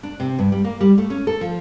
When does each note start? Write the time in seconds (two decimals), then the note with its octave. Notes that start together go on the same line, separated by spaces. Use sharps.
0.03 D4
0.20 C3
0.39 G2
0.52 G3
0.64 A#3
0.81 G3
0.98 A3
1.10 C#4
1.27 A4
1.41 F3